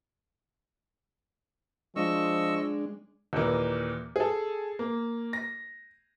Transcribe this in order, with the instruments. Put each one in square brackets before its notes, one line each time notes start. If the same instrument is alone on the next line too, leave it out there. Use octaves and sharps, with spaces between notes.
[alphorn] F3 [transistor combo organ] G#3 D4 [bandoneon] D#5 C#6 E6
[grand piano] D#2 A#2 E3 A#3
G#4 A4
A#3
A#6